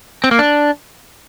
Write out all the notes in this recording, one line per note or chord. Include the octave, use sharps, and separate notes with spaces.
C4
A#3
D4